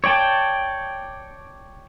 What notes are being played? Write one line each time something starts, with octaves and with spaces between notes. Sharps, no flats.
C#5 D5 G5 A5